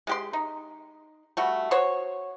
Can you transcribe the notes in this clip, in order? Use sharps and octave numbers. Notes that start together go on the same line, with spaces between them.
G#3 G4 C6
D#4
G3 A3 F#4
F#4 C5 C#5